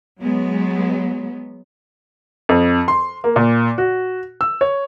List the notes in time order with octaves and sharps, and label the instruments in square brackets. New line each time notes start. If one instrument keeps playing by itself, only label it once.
[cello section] F#3 G#3 B3
[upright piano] F2
C6
A#3
A#2
F#4
E6
C#5